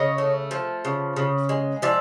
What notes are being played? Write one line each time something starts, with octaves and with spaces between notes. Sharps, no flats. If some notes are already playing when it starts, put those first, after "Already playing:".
Already playing: C#3 C#5 D#5
A3
F3
C#3
C#3
G#3
F3 D5 E5